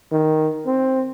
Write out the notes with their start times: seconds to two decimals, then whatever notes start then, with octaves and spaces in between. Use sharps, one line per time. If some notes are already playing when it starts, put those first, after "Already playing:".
0.12 D#3
0.66 C4